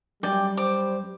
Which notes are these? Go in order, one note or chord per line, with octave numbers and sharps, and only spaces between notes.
F#2 G3 D5 G5
C5 D6